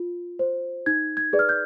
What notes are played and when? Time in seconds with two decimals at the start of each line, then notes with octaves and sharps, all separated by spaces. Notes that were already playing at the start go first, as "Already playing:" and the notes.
Already playing: F4
0.39 C5
0.86 D#4 G#6
1.17 G#6
1.33 G#4 B4 D5
1.39 F6
1.49 G6